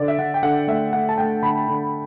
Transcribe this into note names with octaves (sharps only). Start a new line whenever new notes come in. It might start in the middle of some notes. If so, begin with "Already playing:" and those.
Already playing: D3 D5
E5
D3 F#5
G5
D3 F#5
A3 E5
A3 F#5
A5
A3 G5
D3 B5
D3